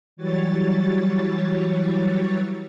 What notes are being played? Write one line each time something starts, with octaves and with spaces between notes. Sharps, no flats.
E3 F#3 G3 C#5 A6